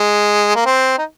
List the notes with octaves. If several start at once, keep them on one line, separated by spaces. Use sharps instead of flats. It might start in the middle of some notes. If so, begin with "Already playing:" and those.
Already playing: G#3
A#3
C4
D#4